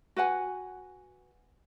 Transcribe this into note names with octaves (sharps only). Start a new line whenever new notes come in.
F#4 B4 F#5 G#5